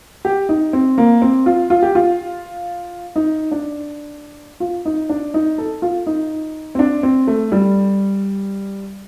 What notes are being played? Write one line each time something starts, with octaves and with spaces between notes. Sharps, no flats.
G4
D#4
C4
A#3
C4
F4
F4
G4
F4
D#4
D4
F4
D#4
D4
D#4
A4
F4
D#4
C4
D4
C4
A3
G3